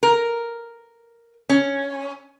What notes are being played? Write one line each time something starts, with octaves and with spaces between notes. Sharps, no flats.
A#4
C#4